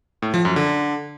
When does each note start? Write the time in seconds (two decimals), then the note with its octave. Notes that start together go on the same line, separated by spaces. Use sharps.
0.22 A2
0.34 F3
0.45 F#2
0.56 D3